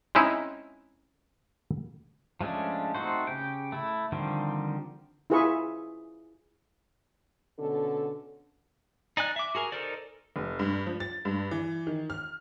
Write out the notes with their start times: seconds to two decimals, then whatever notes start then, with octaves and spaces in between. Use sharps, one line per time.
0.15 G#3 C4 C#4 D#4 E4
2.41 F3 G#3 A3 C#4 D4
2.95 A3 C4 D#4 F#4 C5
3.27 C#3 G4 G5
3.72 A3 E4
4.12 D3 D#3 F3 G3 C4
5.30 E4 F4 G#4 B4 E5 C#6
7.59 B2 D3 C#4 A4
9.17 D#4 D5 G#5 F#6
9.36 E5 D6
9.55 F#4 G#4 A#4 G#5
9.72 D#4 A4 A#4 C5 D5
10.36 F1
10.59 G2
10.87 F3
11.00 A6
11.25 G2
11.51 E3
11.87 D#3
12.10 F6